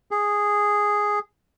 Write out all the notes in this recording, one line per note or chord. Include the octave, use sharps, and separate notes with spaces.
G#4